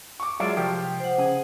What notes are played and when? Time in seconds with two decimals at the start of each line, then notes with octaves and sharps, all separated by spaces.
0.20 C#6 D6
0.40 F#3 G#3 F4 D5 E5
0.57 C2 F3 F4 G4
1.00 C5 F#5
1.18 C#3 G#4